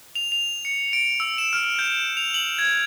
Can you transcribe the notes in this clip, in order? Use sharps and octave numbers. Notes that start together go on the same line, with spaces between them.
F7
F7
C#7
D7
E6
E7
F6
G6
F7
F#7
G#6